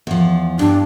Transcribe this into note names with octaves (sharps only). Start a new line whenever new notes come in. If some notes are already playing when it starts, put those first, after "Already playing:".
E2 F3
G2 D4